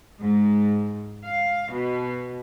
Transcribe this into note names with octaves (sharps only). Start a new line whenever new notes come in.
G#2
F5
B2